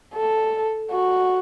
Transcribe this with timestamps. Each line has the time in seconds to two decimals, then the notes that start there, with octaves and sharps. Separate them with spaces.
0.15 A4
0.91 F#4